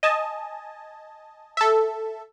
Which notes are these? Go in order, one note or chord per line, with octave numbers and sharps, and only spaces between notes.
D#5 G#5 A5
A4 E5